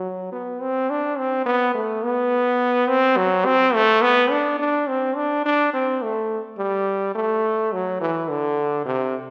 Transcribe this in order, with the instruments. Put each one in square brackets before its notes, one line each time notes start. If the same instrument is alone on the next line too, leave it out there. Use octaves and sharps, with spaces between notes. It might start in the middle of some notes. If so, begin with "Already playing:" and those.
Already playing: [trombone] F#3
B3
C4
D4
C4
B3
A3
B3
C4
F#3
C4
A3
B3
D4
D4
C4
D4
D4
C4
A3
G3
A3
F#3
E3
D3
C3